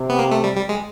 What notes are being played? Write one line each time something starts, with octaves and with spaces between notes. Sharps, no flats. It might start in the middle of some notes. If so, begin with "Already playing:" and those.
Already playing: C3
B3
A#3
A3
G3
G3
G#3